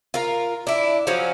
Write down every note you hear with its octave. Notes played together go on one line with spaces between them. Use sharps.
F4 A#4
D4 E4
F3 F#3 C#4